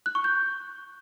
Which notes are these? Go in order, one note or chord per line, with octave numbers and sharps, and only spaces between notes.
F#6
C#6
G6